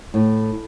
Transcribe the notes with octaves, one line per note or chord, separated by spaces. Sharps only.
A2